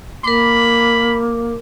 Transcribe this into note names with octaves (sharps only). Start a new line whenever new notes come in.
A#3 A#4 B5 D6